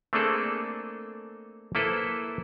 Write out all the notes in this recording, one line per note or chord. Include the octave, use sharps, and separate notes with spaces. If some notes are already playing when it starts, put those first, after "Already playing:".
A3 A#3 C4 D4 G#4 A4
A#3 E4 A4 B4 C5